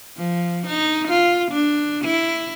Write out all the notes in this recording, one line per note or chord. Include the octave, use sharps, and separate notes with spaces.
F3
D#4
F4
D4
E4